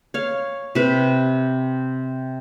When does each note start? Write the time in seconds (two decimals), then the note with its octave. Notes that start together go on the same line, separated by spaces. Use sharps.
0.14 C#5 F5
0.75 C3 B4